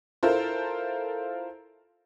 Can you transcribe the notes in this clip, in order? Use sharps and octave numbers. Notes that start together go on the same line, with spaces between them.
E4 F4 A4 A#4 C5